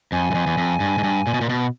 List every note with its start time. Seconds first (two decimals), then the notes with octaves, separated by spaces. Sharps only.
0.12 F2 G#5
0.31 F#2
0.35 F2
0.47 E2
0.58 F2
0.80 G2
0.98 G#2
1.04 G2
1.27 A#2
1.34 B2
1.41 A#2
1.49 B2